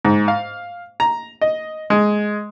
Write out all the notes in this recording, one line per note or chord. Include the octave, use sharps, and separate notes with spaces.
G#2
F5
A#5
D#5
G#3